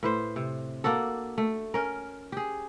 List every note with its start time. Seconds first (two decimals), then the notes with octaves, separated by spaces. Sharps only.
0.03 A2 B4 C5
0.36 C3
0.84 A#3 D4 F#4 A4
1.38 A3
1.74 C#4 A#4
2.32 G4 G#4